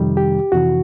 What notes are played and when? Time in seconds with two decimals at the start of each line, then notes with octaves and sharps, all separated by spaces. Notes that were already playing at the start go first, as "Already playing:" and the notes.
Already playing: F2 C3 D#3 G3
0.17 G4
0.52 F2 C3 E3 F#4